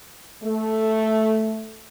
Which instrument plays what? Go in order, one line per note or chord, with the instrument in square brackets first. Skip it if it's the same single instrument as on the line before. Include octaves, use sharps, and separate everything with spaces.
[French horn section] A3